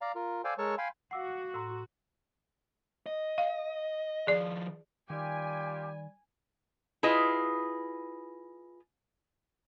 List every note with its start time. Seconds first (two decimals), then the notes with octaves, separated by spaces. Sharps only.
0.01 D5 F5 A#5
0.15 F4 A#4
0.44 A4 C5 D5 F5 G5 G#5
0.58 G#3 A4 A#4 C#5 A5 C#6
0.78 F5 G5 G#5 B5 C6
1.11 F#4 F5 F#5 D6 E6 C7
1.54 A2 A#5 C6 E6
3.06 D#5
3.38 F5
4.27 D#3 F3 G#4 D5
5.10 D#3 G3 F4 G4 G#5
7.03 E4 F4 G#4 B4 D#5